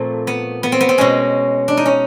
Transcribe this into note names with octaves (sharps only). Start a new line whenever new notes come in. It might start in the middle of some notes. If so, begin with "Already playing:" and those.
Already playing: A#2 F3 A3 C4
B3
B3
C4
B3
C4
B2 G#3 C#4
D4
D#4
C#4